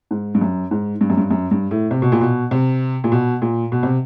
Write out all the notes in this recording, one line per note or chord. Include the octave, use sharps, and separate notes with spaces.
G#2
G2
F#2
G#2
G2
F#2
G2
F#2
G2
A2
C3
B2
A#2
B2
C3
A#2
B2
A#2
B2
C3